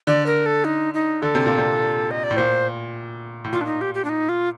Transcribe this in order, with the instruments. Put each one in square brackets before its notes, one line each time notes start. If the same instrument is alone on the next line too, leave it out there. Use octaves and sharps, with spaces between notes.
[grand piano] D3 [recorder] D5
[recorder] A#4
A4
D#4
D#4
[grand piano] D3 [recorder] A4
[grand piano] C3
A#2
C3
[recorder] D#5
D5
[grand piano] A2
[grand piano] A#2 [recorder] C5
[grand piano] A2
[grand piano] A#2 [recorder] F4
[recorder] D4
D#4
G4
G4
D4
D#4
F4